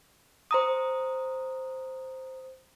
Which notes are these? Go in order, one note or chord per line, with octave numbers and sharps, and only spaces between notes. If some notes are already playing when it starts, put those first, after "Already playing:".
C5 A#5 D#6